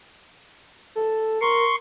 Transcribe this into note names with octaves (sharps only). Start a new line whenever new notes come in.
A4
A#4 C6 C#6